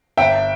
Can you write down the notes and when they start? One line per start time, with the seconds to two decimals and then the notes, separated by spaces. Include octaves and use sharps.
0.17 G1 E5 G5